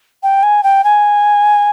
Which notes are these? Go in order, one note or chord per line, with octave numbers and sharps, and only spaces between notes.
G5
G#5
G5
G#5